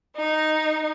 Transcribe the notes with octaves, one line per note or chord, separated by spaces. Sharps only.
D#4